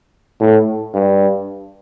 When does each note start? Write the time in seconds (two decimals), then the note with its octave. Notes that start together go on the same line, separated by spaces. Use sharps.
0.40 A2
0.94 G2